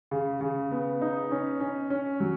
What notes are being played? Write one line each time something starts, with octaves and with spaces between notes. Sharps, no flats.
C#3
C#3
B3
D#4
C#4
C#4
C#4
F#3